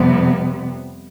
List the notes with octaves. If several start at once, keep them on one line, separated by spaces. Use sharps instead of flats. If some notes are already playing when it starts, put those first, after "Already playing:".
Already playing: F2 C3 G3 B3